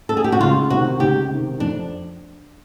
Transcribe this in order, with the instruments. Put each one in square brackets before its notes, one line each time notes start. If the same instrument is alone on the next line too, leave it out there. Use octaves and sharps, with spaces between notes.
[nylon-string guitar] A4
G#4
G4
F#4
[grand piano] C#2 [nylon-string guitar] F4
[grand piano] C3 D#3 [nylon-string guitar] F#4
[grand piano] C#2 [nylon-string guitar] G4
[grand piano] C3 D#3
[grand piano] F2 [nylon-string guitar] D4